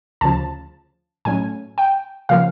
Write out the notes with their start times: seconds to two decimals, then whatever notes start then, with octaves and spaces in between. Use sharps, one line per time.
0.21 D2 C#3 F3 A5
1.25 A2 F#3 A3 C#4 G#5
1.78 G5
2.29 C#3 F3 A#3 F5